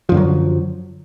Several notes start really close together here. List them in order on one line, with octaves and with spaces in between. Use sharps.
F3 F#2 D3 F#3